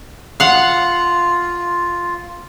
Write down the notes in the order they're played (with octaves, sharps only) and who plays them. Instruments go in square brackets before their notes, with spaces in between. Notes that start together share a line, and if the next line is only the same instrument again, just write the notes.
[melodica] F4 [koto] F5 F#5